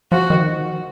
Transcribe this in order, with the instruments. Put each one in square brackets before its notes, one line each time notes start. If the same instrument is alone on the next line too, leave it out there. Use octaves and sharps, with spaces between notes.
[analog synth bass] F3 [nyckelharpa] F#4
[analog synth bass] D#3